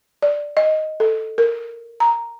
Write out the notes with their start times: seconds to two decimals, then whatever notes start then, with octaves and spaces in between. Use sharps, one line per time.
0.22 D5
0.57 D#5
1.00 A4
1.38 A#4
2.00 A#5